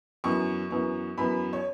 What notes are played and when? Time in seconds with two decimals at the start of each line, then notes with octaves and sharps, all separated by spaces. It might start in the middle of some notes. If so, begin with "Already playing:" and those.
0.24 F#2 E3 B3 C#6
0.70 F#2 E3 B3
1.18 F#2 E3 B3 B5
1.53 C#5